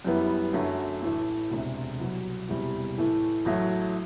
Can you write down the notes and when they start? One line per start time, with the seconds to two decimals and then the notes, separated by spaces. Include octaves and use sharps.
0.05 F#2 E3 G3 B3 E4
0.53 F#2 D3 F#3 A3
1.02 A1 A2 E3 A3
1.50 E1 D2 C3
1.99 C2 B2 F#3
2.49 E1 E2 C3 G3
2.97 A2 E3 A3 E4
3.45 A1 A2 F#3 A3